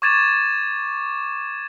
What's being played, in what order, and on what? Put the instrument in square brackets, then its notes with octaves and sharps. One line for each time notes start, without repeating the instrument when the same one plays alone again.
[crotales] C#6 D6 G#6 A6 D#7 E7